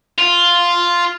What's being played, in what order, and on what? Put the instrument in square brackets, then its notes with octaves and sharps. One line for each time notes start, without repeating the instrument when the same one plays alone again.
[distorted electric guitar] F4